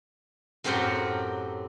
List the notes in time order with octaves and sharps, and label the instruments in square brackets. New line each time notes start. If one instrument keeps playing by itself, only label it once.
[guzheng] F#2 A2 C4 G4 A#4 F#5